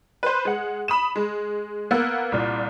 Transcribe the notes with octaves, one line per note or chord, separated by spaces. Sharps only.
B4 C5
G#3 F#5
B5 D#6 E7
G#3
A#3 B3 E6
C2 A#2